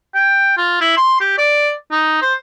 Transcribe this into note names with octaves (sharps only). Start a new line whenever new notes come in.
G5
F4
E4
C6
G4
D5
D#4
C5